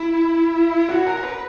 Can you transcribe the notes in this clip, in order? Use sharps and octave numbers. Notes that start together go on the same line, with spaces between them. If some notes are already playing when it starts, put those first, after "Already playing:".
Already playing: E4
F#4
A#4
B4